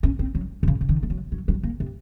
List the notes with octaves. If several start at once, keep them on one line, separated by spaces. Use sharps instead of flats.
C#4
C4
F#3
C3
C#3
C#3
D#3
A3
F#3
F#3
F#3
A#3
C3